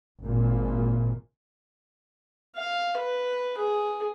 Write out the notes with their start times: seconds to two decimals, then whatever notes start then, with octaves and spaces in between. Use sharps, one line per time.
0.22 G#1 A#2
2.56 F5
2.97 B4
3.58 G#4